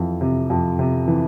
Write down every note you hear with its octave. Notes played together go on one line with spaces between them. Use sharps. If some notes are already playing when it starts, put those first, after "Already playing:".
Already playing: F2 E3
C3
F2
C3
E3